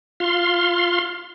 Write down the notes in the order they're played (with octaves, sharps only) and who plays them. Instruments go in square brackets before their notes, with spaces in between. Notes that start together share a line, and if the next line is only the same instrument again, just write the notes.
[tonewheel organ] F4 F5 C6